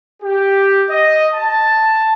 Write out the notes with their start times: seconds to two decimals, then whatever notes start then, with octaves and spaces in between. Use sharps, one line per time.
0.22 G4
0.90 D#5
1.35 A5